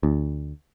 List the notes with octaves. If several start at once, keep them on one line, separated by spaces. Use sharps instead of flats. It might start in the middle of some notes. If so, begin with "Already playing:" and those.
D2